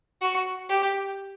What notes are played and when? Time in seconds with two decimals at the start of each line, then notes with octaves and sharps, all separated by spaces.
0.21 F#4
0.69 G4